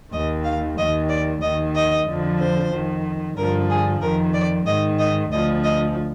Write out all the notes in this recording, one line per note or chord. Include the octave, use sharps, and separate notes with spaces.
D#2 D#3 D#5
F5
D#2 D#3 D#5
D5
D#2 D#3 D#5
D#5
F2 D3 F3
C5
F2 D#3
G2 D3 F3 A#4
G#4
F2 D#3 A#4
D5
G#2 D#3 D#5
D#5
D2 D3 F3 D#5
D#5